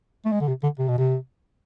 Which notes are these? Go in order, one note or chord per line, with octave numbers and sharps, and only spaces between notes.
A3
G#3
D3
C3
D3
C3
B2
C3